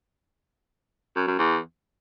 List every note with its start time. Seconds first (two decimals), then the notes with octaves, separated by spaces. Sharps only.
1.16 F#2
1.27 F#2
1.38 E2